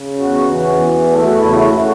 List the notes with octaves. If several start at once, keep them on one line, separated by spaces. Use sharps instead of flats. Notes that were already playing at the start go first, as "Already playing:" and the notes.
Already playing: C#3
E2 F#4
E3
E2
A3 A4
F#4
C#3 E4
F#4
C#3